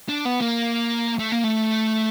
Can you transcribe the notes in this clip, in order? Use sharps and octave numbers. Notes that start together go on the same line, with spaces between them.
D4
B3
A#3
A3
A#3
A3